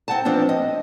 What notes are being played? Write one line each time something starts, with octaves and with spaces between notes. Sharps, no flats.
C4 F#5 A5
F3 B3 C4 D4 F4
D#5